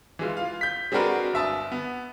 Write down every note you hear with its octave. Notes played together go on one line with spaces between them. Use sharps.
E3 G#3 F4
F4 F5
G6 B6
G#3 C4 D4 F#4 A#4 B4
G1 E5 A5 D#6
B3